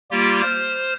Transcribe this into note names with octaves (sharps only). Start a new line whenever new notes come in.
G3 A#3 F4 G4
C5 F6